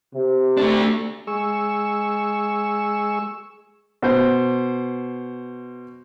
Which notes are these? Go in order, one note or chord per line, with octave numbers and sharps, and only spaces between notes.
C3
A3 D4
G#3 G#4 C#6 E6
B2 C5